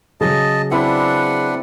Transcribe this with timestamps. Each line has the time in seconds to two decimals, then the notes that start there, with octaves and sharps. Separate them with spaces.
0.21 C#3 F#3 D#5 A5
0.71 C4 D4 E4 B4 D5 F#5